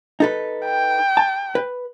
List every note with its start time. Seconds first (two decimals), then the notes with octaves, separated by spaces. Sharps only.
0.20 D#4 A4 B4
0.65 G5
1.17 A5
1.55 B4